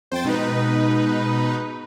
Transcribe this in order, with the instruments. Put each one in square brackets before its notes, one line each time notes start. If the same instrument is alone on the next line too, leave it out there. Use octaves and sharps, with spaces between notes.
[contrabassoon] F2 [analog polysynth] C5 G5 A6
[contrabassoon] G#2 [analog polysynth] B2 D#4 B4